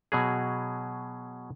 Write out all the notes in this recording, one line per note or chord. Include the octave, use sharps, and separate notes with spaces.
B2 F#3 G#4